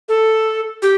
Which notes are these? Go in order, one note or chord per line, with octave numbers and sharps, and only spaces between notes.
A4
G4